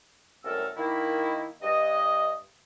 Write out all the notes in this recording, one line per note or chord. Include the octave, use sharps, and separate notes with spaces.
C2 F#2 A3 A4 A#4 E6
D#3 A#3 E4
G2 D#5